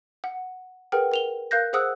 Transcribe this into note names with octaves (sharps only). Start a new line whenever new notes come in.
F#5
G#4 A#4 B4 F#5 G5 F6
A#4 F7 G7
A#4 F5 F#6 G6 A#6
G#4 C5 F#5 D#6 E6 F#6